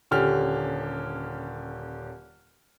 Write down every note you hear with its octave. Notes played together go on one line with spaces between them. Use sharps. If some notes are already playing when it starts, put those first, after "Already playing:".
D#1 D3 C#4 G4 F6